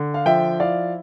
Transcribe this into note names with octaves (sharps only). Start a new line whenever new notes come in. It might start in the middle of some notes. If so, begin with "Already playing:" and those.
Already playing: D3
F5
F3 E5 G5
E4 D5 F5